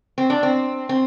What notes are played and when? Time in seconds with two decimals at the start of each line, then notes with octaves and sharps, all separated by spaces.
0.18 C4
0.30 D4
0.43 C4
0.89 C4